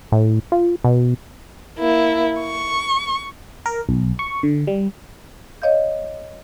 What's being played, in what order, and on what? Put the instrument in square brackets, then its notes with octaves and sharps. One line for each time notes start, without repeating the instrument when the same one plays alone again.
[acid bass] A2
F4
B2
[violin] A#3 E4
C#6
[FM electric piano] A#4
B1
C#6
D3
G3
[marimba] C#5 D#5 F5 G6